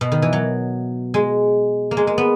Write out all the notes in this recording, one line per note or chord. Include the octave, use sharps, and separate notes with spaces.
B2
D#3
E3
F#3
G#3
A#3
G#3
G#3
B3